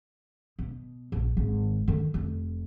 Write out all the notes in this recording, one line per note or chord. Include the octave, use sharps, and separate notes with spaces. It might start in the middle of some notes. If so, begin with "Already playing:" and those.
B2
A#1
G#1 D#3
D3 D#3
F1